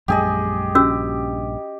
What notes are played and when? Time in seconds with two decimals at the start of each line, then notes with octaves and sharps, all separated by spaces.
0.08 A#1 F#2 G#3 G4 G#4 D#5
0.75 A#1 G2 C#4 F#4 G4 E6